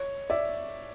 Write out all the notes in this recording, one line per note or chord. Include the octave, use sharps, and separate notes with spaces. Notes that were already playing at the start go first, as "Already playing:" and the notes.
Already playing: C#5
D5 E5